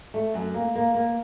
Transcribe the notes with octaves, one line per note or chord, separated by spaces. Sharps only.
A3
F#2
A#3
A#3
A#3